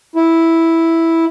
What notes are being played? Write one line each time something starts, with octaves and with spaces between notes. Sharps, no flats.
E4